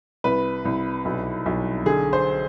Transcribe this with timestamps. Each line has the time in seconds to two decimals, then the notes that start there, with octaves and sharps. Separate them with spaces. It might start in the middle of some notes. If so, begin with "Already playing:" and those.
0.24 C2 B4
0.65 C2
1.05 B1
1.46 B1
1.86 D3 G#4
2.13 C5